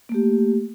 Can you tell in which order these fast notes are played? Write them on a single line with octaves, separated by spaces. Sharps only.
A#3 A3 G4